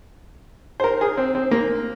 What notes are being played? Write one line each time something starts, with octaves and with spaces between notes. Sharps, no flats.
C5
A#4
G#4
C4
C4
A#3